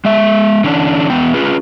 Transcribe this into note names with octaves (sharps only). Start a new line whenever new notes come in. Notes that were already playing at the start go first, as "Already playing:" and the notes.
G#3 E5
D3 E3 C#4 D4
E2 B3 G5
C#4 F4 G#4 B4